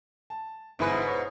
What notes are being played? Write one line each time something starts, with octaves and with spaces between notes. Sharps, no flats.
A5
G1 G#2 B2 E4 B4 G#5
C#5